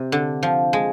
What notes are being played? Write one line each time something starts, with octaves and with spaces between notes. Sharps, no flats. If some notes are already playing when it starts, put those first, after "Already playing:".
Already playing: C3 C4
D3
F3
G#3